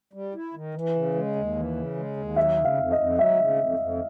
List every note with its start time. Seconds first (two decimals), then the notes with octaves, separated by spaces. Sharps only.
0.13 G3
0.34 E4
0.54 D#3
0.74 E3
0.95 C#3
1.15 G#3
1.36 D#2
1.56 E3
1.76 C#3
1.96 G#3
2.17 D#2
2.36 F#3 E5
2.58 C#3
2.65 F5
2.78 F2
2.91 D#5
2.98 F2
3.18 F#3 E5
3.39 C#3
3.59 F2
3.79 F2